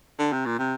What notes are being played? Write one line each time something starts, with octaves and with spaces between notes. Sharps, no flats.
D3
C3
A#2
C3